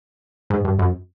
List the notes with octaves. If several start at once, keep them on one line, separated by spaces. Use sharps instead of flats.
G#2
G2
F#2